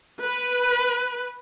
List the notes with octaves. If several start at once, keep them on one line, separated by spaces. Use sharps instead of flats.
B4